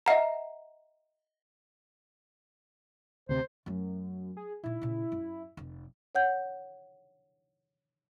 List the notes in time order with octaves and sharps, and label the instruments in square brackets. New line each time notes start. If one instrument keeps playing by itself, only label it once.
[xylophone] D#5 E5 F#5 A#5
[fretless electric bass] D2 C3 [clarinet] C5
[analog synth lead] F#2 [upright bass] F#3 A3
[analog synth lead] G#4
[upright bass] A#2 D#4 [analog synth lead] E4
[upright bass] A#2 C#3
F#2
F1 C4
[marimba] C#5 F#5 G6